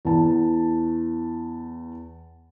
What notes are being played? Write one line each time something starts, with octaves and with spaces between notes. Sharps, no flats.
E2 A5